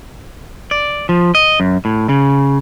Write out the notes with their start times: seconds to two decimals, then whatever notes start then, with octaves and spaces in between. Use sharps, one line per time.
0.71 D5
1.09 F3
1.35 D#5
1.60 F#2
1.85 A2
2.09 C#3